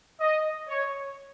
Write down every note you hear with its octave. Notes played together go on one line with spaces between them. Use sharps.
D#5
C#5